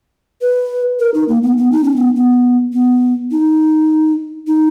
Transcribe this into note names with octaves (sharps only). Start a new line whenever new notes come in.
B4
A#4
D#4
A#3
B3
B3
D#4
C#4
B3
B3
B3
D#4
D#4